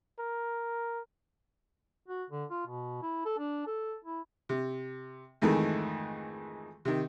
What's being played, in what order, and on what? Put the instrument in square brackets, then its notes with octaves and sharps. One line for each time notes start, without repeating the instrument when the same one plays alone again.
[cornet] A#4
[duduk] F#4
D3
F4
B2
E4
A4
D4
A4
E4
[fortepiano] C3
F2 G#2 D#3 E3 G#3 A3
C3 D#3